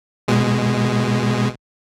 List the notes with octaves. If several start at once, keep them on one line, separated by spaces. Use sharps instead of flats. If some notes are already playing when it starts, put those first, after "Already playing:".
B2 G#3